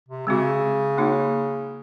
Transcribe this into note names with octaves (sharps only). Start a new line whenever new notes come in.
C3
C#3 G#3 C4 F#4
A#3 D#4 F#4 C#5